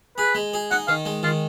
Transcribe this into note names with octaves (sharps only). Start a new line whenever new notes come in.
G#4 B4
G#3
G#4
D#4 F#5
D#3 F5
G#3
D#3 F4